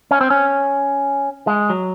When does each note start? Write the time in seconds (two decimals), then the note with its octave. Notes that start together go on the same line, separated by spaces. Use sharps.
0.11 C#4
0.21 C4
0.30 C#4
1.47 G#3
1.70 F#3